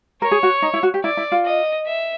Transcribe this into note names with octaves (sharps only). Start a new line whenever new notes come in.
A#4 C#5
G#4
F#4
D#4
E4
F#4
G4
E4 D5
E4
F4
D#5
E5